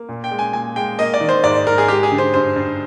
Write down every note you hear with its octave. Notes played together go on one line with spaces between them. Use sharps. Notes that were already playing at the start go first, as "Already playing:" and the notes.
Already playing: A#3
A#2
G5
G#3
G#5
A#2 G#5
G#3 G5
A#3 D#5
D5
D#3
C5
G#2 D5
G#2 A#4
G#4
G#3 G4
G#4
D3
C5
G2 C5
G2